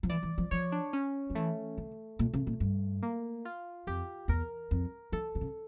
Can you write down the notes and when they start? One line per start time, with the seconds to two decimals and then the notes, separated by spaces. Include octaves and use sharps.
0.03 F3
0.09 E3 D5
0.23 E3
0.38 F3
0.51 F3 C#5
0.72 D4
0.93 C#4
1.30 F3
1.35 E3 A3
1.78 D3
2.19 A#2
2.34 C#3
2.47 A#2
2.60 G2
3.03 A#3
3.45 F4
3.87 F2 G4
4.28 E2 A#4
4.71 F2
5.12 E3 A4
5.35 D3
5.41 C#3